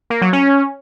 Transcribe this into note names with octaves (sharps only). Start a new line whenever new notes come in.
A#3
F#3
C#4